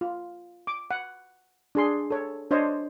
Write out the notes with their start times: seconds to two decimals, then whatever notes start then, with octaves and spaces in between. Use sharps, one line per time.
0.01 F4
0.67 D6
0.91 F#5
1.75 D4 G#4 C6
2.11 A4 C#5
2.51 D4 C5 C#5 D#5